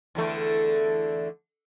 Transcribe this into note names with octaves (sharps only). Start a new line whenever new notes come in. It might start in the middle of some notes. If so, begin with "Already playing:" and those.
E2 D3 A3